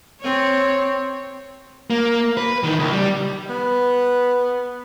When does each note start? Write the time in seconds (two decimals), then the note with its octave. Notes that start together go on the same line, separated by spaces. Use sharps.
0.21 C4 C#5
1.90 A#3
2.37 B4
2.63 D#3 E3
2.79 C#2
2.92 G3
3.50 B3